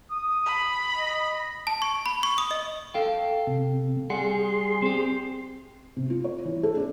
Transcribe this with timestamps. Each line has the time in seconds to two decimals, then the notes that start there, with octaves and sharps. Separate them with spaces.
0.12 D#6
0.46 B5
0.98 D#5
1.67 A5
1.82 C#6
2.06 B5
2.23 C#6
2.38 D#6
2.51 D#5
2.94 A4 F5 G5
3.47 C3
4.10 G3 G#4 F#5 C6
4.82 C4 G4
5.96 C3
6.10 F4
6.24 C#5
6.45 E3
6.63 A4
6.77 D4